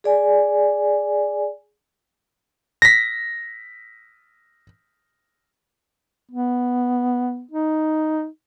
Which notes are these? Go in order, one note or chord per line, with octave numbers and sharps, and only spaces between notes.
G#4 D5 G#5
A#6 B6
B3
D#4